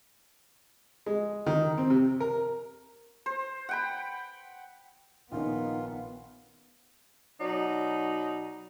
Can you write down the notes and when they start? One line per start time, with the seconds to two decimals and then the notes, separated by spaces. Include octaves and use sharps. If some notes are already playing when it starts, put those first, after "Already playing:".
1.06 G#3
1.47 D#3
1.78 C4
1.90 C3
2.20 A#4
3.26 C5
3.69 F#5 G5 B5
5.32 A#1 D#3 B3 C#4 D#4 F4
7.40 B2 F#3 D#4 D5